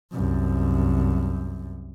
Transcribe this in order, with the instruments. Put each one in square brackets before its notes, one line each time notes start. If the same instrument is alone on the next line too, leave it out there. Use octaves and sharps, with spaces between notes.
[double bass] C2 F#2